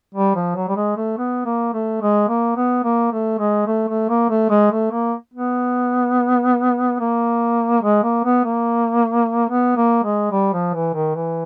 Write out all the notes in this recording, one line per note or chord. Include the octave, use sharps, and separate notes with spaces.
G3
F3
F#3
G3
G#3
A3
B3
A#3
A3
G#3
A#3
B3
A#3
A3
G#3
A3
A3
A#3
A3
G#3
A3
A#3
B3
A#3
G#3
A#3
B3
A#3
B3
A#3
G#3
G3
F3
E3
D#3
E3